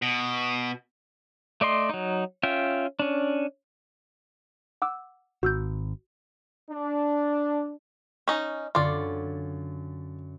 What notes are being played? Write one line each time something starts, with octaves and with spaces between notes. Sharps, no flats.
B2
A3 D5 D#5 C6
F#3 D#4
C#4 F4 E5 G5
C#4 D4
F#5 D6 E6
G#1 F#4 E6 G6
D4
C#4 D#4
F#2 D3 F4 D5 C#6